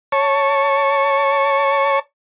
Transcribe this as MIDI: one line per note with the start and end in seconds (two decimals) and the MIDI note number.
0.12 1.99 73
0.12 1.99 81
0.12 1.99 85